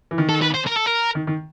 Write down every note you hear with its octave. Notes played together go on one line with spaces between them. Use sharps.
E3
D#3
A4
B4
C5
A#4
A4
A#4
D#3
D#3